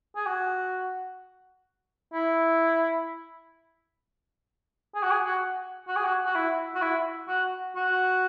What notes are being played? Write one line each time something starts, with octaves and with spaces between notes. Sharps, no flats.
G#4
F#4
E4
G#4
F#4
G#4
F#4
F#4
G#4
F#4
F#4
E4
F#4
E4
F#4
F#4